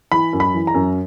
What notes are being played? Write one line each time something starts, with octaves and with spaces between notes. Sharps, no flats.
E3 B5
F#2
B5
E3
A#5
F#2